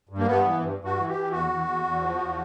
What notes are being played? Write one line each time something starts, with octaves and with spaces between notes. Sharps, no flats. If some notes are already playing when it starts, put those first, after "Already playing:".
G2
A#3
G2 B3
E3
G2
G2
F#4
E3
G4
E3
E2 F#4
E2
E2
E2
F3
E2